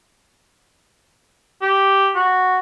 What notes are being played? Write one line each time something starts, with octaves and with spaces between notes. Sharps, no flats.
G4
F#4